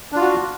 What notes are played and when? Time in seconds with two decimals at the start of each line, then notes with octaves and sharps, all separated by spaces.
0.12 D4
0.16 F4
0.21 F#4